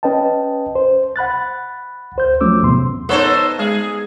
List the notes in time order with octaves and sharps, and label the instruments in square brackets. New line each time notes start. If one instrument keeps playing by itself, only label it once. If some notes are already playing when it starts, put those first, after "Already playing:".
[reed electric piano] C#4 B4 D#5 G5 A5
C5
F#5 B5 F#6 A6
D2 C5 G6
F3 F#3 A3 C#4 D6 E6
E2 A2 C3 B3 C6
[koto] B3 D#4 [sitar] A4 C5 C#5
[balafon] G#3 [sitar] G#4